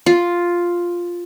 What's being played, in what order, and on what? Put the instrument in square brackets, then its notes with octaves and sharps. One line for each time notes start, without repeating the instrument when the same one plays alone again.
[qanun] F4